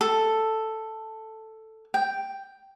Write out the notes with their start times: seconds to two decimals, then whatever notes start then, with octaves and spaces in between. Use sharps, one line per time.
0.01 A4
1.94 G5